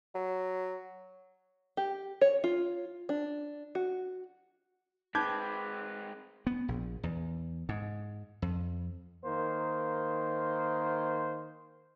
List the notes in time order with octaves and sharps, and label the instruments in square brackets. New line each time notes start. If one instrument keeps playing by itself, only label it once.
[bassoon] F#3
[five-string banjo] G4
C#5
F4
D4
F#4
[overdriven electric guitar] G#3 C4 [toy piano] D#4 [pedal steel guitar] B4 [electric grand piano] D6 G6 G#6
[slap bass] B3
A#1
E2
G#2
F2
[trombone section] D#3 A#3 C5